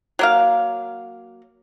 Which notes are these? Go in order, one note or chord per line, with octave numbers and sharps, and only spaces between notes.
F#3 A#3 F5